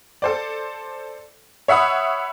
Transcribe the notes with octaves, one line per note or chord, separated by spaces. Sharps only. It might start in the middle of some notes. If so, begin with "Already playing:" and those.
A4 C5 D5
C#5 E5 F#5 B5 D#6